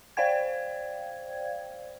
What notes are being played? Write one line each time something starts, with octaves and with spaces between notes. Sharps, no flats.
C5 D5 F5 G5 G#6